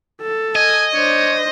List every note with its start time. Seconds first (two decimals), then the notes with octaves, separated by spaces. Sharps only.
0.21 A4
0.55 D#5 G#5
0.94 D4 C5 C#5